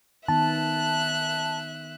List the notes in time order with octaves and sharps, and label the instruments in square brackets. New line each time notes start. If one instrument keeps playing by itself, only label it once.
[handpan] D#3 B3 [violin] E5 F#6 [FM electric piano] A5